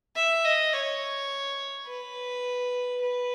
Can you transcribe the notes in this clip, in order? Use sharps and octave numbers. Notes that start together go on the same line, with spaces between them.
E5
D#5
C#5
B4
B4